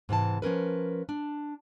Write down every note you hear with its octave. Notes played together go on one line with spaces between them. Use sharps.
G#2 C3 E3 A5
F3 C#4 A#4 B4
D4